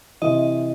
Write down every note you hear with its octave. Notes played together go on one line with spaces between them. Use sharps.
C3 E3 D#5